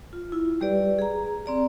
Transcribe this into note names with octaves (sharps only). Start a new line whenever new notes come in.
F4
E4 F4
G3 G4 B4 D5
G#4 A#5
C4 D5 A#5